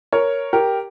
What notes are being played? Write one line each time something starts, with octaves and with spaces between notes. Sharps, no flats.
A#4 C#5
G4 A#4